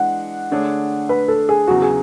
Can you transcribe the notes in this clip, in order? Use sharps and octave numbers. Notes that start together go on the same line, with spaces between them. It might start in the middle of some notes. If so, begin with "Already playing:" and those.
Already playing: E3 G#3 D4 F#5
D3 A3 D4 G#4 C#5
B4
A4
G#4
E2 C#3 F#3 F#4
G#4